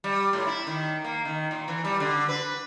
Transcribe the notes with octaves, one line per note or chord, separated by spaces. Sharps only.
G3
A2
E4
D#3
A#3
D#3
A#2
E3
G3
D3
B4